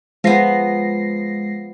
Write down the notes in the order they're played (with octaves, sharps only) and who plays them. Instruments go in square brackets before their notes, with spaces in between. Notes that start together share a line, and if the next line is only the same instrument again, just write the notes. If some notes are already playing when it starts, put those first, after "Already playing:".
[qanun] F3 B3 [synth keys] G#3 A#6 C7